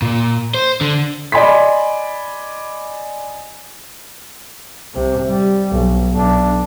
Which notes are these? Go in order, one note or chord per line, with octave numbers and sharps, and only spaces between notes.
A#2
C5
D3
D5 D#5 G#5 B5 C6 B6
C2 C3
G3
B1
B1 D4